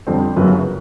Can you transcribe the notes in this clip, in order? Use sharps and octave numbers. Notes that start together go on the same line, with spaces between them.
F2 D3 G3 C4
G1 F#2 C#3 F#3 B4